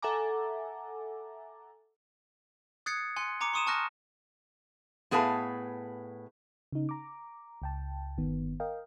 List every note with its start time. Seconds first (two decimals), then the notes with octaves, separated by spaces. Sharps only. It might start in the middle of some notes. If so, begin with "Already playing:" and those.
0.02 A4 E5 F#5 G#5 A#5 D6
2.86 D#6 F#6 G#6 A6 C7 C#7
3.16 G#5 C6 F#6 C#7
3.41 G#5 A#5 D6 C#7
3.53 C6 C#6 D#6 D#7 E7
3.67 G#5 A5 C#6 F6 F#6 A#6
5.11 A2 B3 G#4 B4 F5 A5
6.72 C#3 D#4
6.89 A#5 D6
7.62 C#2 G5 A5
8.18 G1 D#3 B3
8.60 A#4 D#5 F5 G5